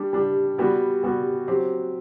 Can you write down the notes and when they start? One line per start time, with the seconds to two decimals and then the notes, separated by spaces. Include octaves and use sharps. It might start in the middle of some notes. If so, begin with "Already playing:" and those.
Already playing: G3 D4 G4
0.13 G3 D4 G4
0.58 G3 B3 F#4
1.03 G3 B3 F#4
1.48 F#3 C4 G4